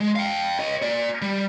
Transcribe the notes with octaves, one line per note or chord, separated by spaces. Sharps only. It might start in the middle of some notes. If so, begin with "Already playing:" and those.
G#3
F5 G5
C#5 D#5
A#3 D5
G3